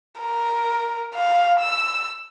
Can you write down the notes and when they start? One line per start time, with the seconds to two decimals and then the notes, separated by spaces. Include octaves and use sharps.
0.19 A#4
1.15 F5
1.60 E6